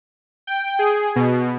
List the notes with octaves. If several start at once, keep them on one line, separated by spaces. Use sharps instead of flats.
G5
G#4
B2